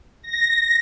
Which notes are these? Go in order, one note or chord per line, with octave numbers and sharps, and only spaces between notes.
A#6